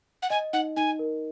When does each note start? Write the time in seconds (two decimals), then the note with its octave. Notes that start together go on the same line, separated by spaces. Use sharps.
0.22 F#5
0.30 D#5 G#5
0.53 D#4 F#5
0.76 D#4 G#5
0.99 A#4